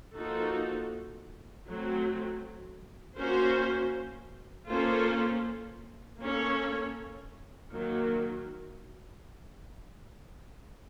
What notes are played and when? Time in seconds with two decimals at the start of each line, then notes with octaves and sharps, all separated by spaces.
0.14 F3 A#3 D#4 F#4 A4
1.66 F#3 A3 C4
3.17 A#3 C#4 F#4 C5
4.69 A#3 C#4 F4 A4 C5
6.20 A#3 C#4 A4 C#5
7.72 D#3 F#3 A#3